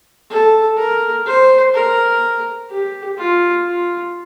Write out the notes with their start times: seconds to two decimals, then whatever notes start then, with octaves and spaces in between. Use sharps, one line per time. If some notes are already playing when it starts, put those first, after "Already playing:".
0.30 A4
0.78 A#4
1.26 C5
1.74 A#4
2.70 G4
3.18 F4
3.66 F4